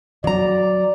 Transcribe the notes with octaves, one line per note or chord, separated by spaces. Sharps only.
F#3 D5 A#5